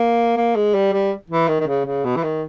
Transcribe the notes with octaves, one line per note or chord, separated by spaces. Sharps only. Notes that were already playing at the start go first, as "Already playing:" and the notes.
Already playing: A#3
A#3
G#3
G3
G3
E3
D#3
D#3
C#3
C#3
B2
E3
D#3